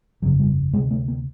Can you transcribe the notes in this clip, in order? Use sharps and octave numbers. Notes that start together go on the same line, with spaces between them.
G1 F2 C#3 F#3
G3
D2 C3 G#3
A3
A#3